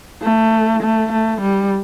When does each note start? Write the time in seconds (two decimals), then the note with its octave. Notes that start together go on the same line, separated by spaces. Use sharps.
0.23 A3
0.82 A3
1.12 A3
1.41 G3